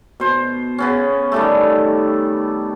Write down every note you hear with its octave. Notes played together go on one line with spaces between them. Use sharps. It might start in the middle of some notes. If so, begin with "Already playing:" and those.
B2 C5
C#3 B3 C#4
D#3 G3 A3